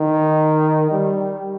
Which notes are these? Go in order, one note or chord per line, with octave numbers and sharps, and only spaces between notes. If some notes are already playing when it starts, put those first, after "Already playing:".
Already playing: D#3
G3